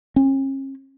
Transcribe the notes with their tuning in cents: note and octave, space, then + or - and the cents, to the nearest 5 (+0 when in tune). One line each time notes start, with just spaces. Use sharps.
C#4 -40